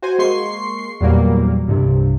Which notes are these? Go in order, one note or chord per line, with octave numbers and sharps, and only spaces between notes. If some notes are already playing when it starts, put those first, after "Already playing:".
F#4 C5 G#5
G#3 A#3 C6 C#6 C7
E2 A#2 F#3 G3 A#3
C2 G2 C3